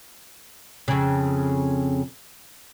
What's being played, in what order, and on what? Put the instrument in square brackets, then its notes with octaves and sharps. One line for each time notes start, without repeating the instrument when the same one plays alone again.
[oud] F2 C#3